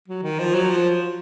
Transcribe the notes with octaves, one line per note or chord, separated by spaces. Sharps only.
F#3
D#3
F3
F#3
F3